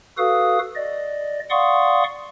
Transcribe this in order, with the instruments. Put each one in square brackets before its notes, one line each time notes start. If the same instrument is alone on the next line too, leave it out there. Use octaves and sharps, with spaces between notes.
[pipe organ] F#4 A4 B4 F5 D#6
D5 D#5
D5 F5 F#5 C6 C#6 D#6